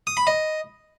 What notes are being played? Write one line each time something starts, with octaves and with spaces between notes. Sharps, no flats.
D#6
B5
D#5